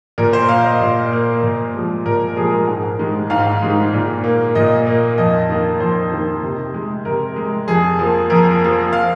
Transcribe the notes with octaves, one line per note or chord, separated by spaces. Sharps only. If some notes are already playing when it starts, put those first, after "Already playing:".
A#2 A#4
C5
A#3 F5
D#5
A#2
A#3
A#2
F3 G#3
A#2 A#4
F3 G#3 G#4
A#4
G#2
D#3 G#3
G#2 F5
D#3 G#3
A#2
A#3
A#2 D#5
A#3
F2 D#5
D#3 A#3
F2 C5
D#3 A#3
C3
G#3
C3 A#4
G#3
F2 G#4
F3 A#3
F2 A#4
F3 A#3
F5